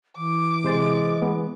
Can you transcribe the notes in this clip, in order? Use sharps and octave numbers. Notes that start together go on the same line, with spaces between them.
E3 D6
C3 G#3 C5 A6
G#3 B3